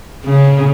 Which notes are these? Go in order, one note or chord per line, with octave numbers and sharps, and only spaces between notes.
C#3